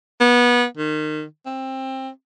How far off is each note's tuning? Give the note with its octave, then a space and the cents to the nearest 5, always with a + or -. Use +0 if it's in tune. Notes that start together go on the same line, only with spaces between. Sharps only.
B3 -25
D#3 -25
C4 +20